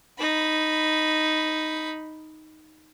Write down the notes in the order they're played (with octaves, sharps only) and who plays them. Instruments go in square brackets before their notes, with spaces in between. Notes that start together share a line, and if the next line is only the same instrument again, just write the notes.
[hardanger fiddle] D#4 B5